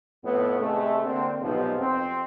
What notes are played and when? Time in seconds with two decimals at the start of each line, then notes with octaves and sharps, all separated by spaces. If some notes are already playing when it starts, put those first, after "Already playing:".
0.24 F2 A2 A3 B3
0.59 C3 G#3 A3
1.04 D3 A#3 C4
1.41 B1 G#2 C3 F3 B3
1.79 F2 C4